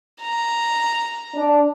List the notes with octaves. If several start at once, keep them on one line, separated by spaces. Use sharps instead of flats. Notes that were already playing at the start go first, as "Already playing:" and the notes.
A#5
D4 D5